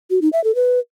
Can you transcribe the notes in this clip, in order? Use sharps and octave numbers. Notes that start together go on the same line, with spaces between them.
F#4
D#4
E5
A4
B4